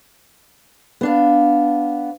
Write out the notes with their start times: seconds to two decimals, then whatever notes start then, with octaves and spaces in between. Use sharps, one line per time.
1.01 B3 D4 F5